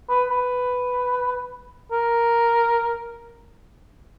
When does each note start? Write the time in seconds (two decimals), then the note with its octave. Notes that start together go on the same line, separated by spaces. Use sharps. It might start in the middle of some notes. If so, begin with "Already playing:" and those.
0.09 B4
0.30 B4
1.92 A#4